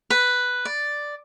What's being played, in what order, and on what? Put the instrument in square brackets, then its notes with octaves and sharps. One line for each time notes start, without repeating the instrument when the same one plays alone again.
[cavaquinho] B4
D5